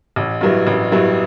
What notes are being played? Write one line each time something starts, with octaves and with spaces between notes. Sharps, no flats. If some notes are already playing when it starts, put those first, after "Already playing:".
A1
G2 F#3 B3 E4
A1
G2 F#3 B3 E4